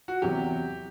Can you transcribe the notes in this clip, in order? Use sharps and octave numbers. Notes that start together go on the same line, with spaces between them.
F#4
E2 C3 F#3 G4